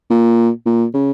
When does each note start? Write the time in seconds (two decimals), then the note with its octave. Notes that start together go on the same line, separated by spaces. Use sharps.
0.10 A#2
0.65 A#2
0.94 C#3